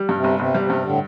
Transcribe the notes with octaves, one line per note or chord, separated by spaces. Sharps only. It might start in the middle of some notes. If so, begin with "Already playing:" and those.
Already playing: G3
G2
C3
G1
G1 C3
G3
C3
G2
A2 D3